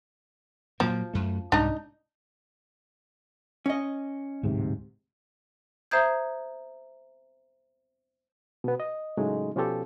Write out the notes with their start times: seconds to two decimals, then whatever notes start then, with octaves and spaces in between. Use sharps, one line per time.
0.80 A#2 F3 F#3 A#3
1.14 F#2 A3
1.52 C2 G#2 C3 D4 D#4
3.66 C#4 D#5
4.43 D1 G#2 C3
5.91 C5 E5 A#5 D#6 G6 G#6
8.64 B2 B3
8.80 D#5
9.17 A2 C#3 F#3 G#3 A3 D#4
9.55 B2 F3 C#4 F4 G4 A4